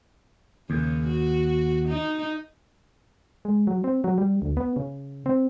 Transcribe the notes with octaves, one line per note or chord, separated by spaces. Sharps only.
D#2 C#3
F#4
D#4
G#3
F#3
C4
F#3
G3
D2
B3
C#3
C4